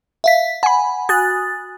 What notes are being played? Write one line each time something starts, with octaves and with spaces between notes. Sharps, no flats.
E5 F5 B6
F#5 G#5 B5
F#4 G#5 D#6 F#6 A6